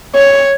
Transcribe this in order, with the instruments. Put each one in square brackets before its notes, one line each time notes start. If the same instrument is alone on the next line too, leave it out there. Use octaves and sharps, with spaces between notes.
[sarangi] C#5